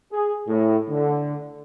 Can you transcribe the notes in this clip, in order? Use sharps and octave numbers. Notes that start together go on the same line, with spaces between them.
G#4
A2
D3